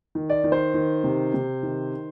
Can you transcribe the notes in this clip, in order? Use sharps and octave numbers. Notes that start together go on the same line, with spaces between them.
D#3
D5
D#3
C5
D#3
C3
C3
D#3